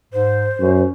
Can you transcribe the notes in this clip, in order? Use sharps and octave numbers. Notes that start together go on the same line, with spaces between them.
G#2 C5
F#2 C#4